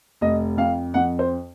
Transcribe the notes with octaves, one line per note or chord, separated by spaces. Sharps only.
F1 D#5
F2 F5
F2 F#5
C5